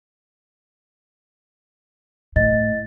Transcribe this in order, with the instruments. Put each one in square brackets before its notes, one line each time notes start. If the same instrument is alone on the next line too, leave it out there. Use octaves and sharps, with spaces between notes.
[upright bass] A2 [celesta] D#5 A6